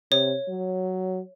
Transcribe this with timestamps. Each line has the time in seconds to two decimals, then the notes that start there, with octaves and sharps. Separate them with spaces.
0.12 C3 C#5
0.49 F#3